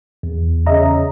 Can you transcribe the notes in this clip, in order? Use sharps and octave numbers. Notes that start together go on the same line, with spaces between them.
E2
C#3 D#5 E5 A#5